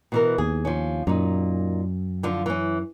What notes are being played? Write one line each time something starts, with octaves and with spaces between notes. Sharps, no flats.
B2 E3 A#4
D#2 G#4
F3 C#4
F#2 A#2 D#4
D3 F3
E3 C#4